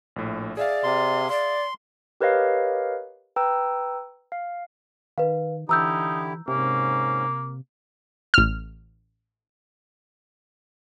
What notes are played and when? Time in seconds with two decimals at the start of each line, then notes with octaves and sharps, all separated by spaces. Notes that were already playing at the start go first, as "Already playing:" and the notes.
0.16 A#1 A2
0.57 G#4 D5 E5 F5
0.84 C3 C6
1.30 D5 C6
2.21 G4 A#4 B4 C#5 D#5 F5
3.36 B4 G5 A#5 E6
4.32 F5
5.18 D#3 B4 F5
5.69 D3 E3 D#4 E4 G4 A#5 E6 G6
6.48 G#2 C3 A#3 C#4
8.34 A1 F6